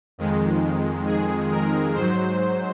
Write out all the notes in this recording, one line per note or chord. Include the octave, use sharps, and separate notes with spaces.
F2 D#3 G#3
G#4
A#4
G#2 F#3 C5